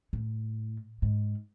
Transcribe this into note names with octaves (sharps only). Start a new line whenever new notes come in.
A2
G#2